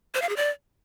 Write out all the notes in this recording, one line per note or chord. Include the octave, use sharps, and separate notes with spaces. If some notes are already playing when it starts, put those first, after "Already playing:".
C5
F5
G#4
D5